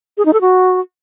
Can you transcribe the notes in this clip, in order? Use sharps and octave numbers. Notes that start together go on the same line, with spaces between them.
G#4
D#4
A4
F#4